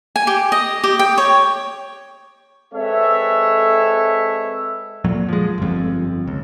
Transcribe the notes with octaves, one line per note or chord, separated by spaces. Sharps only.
G#5
G4
D#5
G4
G5
C#5
G#3 C4 A4 B4 C#5 E5
F2 A#2 F#3
F3 G#3
G1 F2
C#2